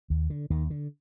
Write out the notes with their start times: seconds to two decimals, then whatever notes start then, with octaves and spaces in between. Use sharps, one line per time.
0.10 D#2
0.30 D3
0.50 D#2 D#3
0.70 D3